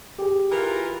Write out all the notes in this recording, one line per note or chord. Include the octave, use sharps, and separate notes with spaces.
G4 G#4
E3 F4 A#4